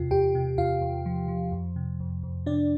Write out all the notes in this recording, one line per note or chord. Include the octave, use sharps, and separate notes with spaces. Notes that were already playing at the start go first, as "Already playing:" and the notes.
Already playing: E2 C3 F4
E2 G4 G5
C3
E2 F4 F5
E2
F3
F3
F2
C3
F2
F2
C3 D4 D5